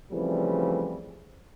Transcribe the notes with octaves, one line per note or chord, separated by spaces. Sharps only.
C#3 E3 F3 G3 A3 C4